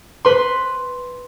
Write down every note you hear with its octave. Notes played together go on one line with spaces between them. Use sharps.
B4 C6